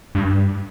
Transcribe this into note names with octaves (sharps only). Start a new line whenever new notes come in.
G2